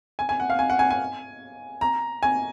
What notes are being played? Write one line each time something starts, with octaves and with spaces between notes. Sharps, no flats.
G#5
G#5
F#5
F5
G#5
F#5
G#5
G#5
A#5
G#5